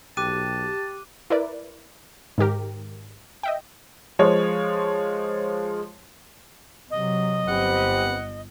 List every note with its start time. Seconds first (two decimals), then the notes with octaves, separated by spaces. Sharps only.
0.17 B1 G4 A5 D6 F#6 D#7
1.30 E4 A#4 B4 D5
2.38 G#2 D#3 G4 A#4
3.43 D#5 E5 G5
4.19 F3 G#3 C#5
6.91 C3 F#3 D#5
7.48 G1 C4 G4 B4 F#5